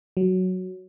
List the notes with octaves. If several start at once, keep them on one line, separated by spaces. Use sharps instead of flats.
F#3